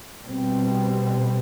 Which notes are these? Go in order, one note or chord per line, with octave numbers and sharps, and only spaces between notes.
B2 G3 C4